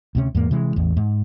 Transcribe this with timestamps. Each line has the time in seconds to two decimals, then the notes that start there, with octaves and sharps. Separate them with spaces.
0.15 D2 C3 C#4
0.35 E2 G#2 A#3
0.51 C3 E3 G#3
0.76 A1 E2
0.97 G#2